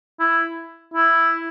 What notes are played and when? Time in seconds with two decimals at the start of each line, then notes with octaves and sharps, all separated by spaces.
0.20 E4
0.94 E4